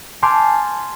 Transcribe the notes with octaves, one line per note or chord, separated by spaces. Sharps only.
G#5 A5 C6 D6 F6 G6